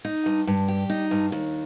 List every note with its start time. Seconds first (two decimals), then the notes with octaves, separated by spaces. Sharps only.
0.05 D#4
0.26 G2
0.47 G2
0.68 G4
0.90 D#4
1.11 G2
1.32 D#2